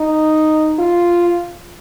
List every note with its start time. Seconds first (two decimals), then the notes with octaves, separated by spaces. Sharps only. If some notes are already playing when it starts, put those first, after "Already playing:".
Already playing: D#4
0.79 F4